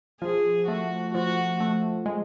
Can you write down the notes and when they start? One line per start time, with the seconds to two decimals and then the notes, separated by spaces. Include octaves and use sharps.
0.22 F3 G#4
0.68 A3 F#4
1.14 F3 F#4
1.60 A3
2.06 G#3